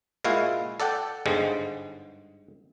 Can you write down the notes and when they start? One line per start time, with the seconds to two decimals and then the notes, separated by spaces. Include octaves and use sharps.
0.24 A#2 G#3 E4 F#4 F5
0.80 A4 D5 F#5 G5
1.26 G1 G#2 D3 G3 G#3